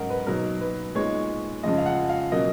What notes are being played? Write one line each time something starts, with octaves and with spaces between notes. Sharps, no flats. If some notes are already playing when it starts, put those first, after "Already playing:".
Already playing: G#2 F#3 C#4 A#4 D#5 F#5
B4
B2 F#3 A#3 D#4 A#4
B4
A#2 G#3 B3 D#4 C#5
F2 C#3 F3 G#3 D#5
F5
F#5
F5
B2 F#3 A#3 C#4 D#5